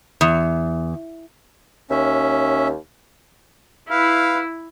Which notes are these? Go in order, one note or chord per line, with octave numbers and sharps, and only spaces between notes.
E2
D#2 C#4 E5
E4 B4 F5